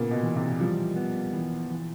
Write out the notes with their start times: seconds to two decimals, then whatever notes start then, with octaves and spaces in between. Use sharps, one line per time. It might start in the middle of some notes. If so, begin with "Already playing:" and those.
Already playing: A#2 C#3 B3
0.11 B2
0.23 E3
0.36 C3
0.60 F3 G3
0.96 B3
1.33 E3
1.70 E3